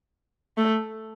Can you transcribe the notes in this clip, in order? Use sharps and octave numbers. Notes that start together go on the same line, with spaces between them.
A3